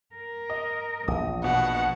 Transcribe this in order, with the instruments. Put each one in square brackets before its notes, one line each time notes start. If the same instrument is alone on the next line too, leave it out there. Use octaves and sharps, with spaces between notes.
[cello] A#4
[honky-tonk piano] D#5
[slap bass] A#1 [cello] E2 [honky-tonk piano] D#6
[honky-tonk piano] B2 [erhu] F#5